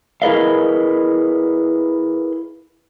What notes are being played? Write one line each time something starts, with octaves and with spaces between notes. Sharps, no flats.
E4 G#4 A#4 B4 D#5 F5